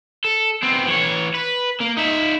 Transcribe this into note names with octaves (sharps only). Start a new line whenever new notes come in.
A4
B3 C4
E3 C#5
B4
A#3
D#4 E5